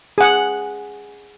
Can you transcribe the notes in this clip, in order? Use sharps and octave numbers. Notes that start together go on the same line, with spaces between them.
G#4 F#5